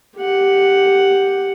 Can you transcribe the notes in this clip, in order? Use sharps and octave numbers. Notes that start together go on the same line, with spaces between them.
G4 F#5